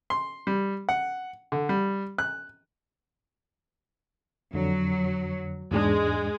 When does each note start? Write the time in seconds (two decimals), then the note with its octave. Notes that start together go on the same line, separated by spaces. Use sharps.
0.10 C6
0.47 G3
0.89 F#5
1.52 D3
1.69 G3
2.18 F#6
4.54 F2 D3 F#3
5.71 E2 G#2 G#3 D4